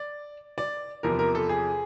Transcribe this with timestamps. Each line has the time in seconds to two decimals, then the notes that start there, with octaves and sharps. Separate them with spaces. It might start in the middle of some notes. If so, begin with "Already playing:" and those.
Already playing: D5
0.58 D5
1.03 E2 C3 F3 A#4
1.19 A#4
1.35 A4
1.49 G#4